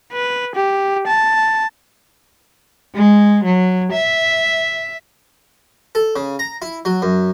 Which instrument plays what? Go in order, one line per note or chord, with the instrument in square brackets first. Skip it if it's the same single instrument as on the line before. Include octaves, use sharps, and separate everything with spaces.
[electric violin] B4
G4
A5
[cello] G#3
F#3
E5
[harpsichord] A4
C#3
A#5
E4
F#3
F#2